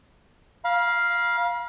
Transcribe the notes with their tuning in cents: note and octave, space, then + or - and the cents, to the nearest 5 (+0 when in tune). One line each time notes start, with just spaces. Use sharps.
F5 +0 B5 -45